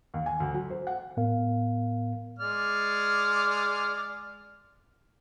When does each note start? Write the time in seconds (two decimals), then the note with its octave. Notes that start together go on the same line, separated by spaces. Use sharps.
0.14 D#2
0.26 G#5
0.40 D2
0.54 F#3
0.70 C5
0.87 F#5
1.17 A2 B3 A#4 F5
2.39 G#3 D5 F6